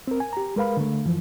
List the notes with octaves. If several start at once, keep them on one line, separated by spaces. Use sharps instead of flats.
C4 A#4
G#5
G4 A#5
G#3 A#4 B4 F5 B5
D3 A3
F#2 E3 F3